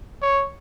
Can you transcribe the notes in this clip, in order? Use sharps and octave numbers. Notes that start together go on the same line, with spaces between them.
C#5